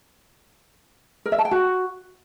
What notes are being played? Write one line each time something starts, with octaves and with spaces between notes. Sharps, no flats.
A#4
E5
A5
G5
F#4